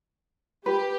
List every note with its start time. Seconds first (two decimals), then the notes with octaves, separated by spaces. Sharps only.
0.66 G4 B4